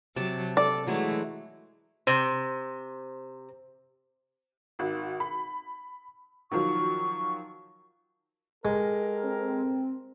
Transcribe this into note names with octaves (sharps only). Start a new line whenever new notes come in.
C3 F#3 A5 D6
A4 D5
E3 F#3 G#3 A3 E4
C3 C5
G#1 F#4
B5
D#3 F3 F#3 C#6
G#3 G4 A4 A#4
C4